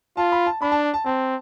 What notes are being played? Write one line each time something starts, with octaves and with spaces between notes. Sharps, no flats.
F4 A5
B5
A5
D4 B5
A5
A5
C4 A5